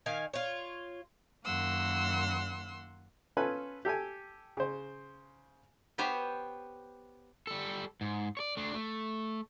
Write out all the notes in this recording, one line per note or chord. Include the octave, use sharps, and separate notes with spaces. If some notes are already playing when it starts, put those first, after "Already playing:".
D#3 F5 G#5
F4 C#5
F#2 D#3 A#3 F#5 C6 E6
C#4 F4 A4 B4 G#5
G4 A4 G5 G#5
C#3 C5
B3 G4 C5 C#5
G3 A4
G#2
C#5 D5
A3 D4
A3